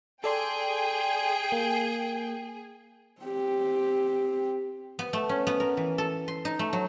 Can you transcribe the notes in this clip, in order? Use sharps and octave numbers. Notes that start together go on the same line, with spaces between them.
G#4 A4 D5 G5 C6
A#3
C4 G4
B3
A3
C#4
B3
A#4
E3
A4
C6
D#4
A3
F#3